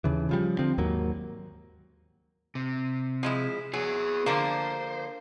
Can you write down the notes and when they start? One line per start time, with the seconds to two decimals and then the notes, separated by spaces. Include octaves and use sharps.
0.04 D#2 C#3 E3
0.29 C#3 F3 G3
0.59 D3 F3 C4
0.78 D#2 G#2 F#3 A#3
2.55 C3
3.23 F3 G#3 E4
3.74 F#3 B3 G#4
4.26 D3 F3 A#3 C5